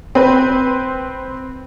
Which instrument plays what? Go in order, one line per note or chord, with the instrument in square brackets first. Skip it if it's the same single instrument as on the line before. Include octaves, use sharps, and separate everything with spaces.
[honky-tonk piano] C4 B4